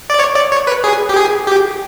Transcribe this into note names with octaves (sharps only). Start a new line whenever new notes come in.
D5
C#5
D5
C#5
B4
G#4
G4
G#4
G4